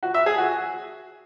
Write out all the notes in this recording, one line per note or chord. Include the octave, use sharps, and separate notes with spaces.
F#4
E5
G#4
F#4